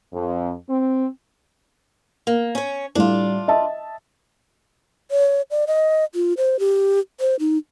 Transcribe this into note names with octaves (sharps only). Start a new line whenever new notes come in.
F2
C4
A#3
C#4 C#5
A2 G3 D4 F4
D#5 E5 A5
C#5
D5
D#5
F4
C5
G4
C5
D#4